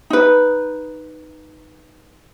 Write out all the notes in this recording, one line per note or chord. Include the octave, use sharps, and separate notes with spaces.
D#4 B4